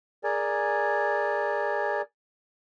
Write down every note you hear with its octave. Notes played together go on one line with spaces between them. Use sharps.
G#4 A#4 D5 G#5